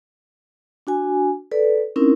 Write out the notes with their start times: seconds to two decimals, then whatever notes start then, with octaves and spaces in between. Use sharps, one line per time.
0.87 D4 F#4 G#5
1.51 A4 B4 D5
1.96 C4 C#4 D#4 E4 A#4